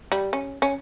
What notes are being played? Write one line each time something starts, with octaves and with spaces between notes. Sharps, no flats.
G3
C#4
C#4